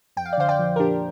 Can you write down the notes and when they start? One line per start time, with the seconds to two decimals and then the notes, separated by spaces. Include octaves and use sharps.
0.17 F2 G5
0.25 F5
0.33 D5
0.38 D3 C5 F5
0.48 D5 G5
0.59 F3
0.76 A#4
0.80 A#2 D4 G4